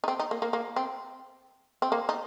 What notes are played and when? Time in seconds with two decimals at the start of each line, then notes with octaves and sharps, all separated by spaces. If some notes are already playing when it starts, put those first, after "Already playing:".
0.04 D#4
0.08 C4
0.19 D#4
0.31 A#3
0.42 A#3
0.53 A#3
0.76 C4
1.82 C4
1.92 A#3
2.09 D#4